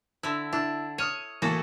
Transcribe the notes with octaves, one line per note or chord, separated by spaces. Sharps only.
D3 E4
D4 E4 E6
C#5 D#6 F6 D#7
A2 E3 A#3 F#4 A4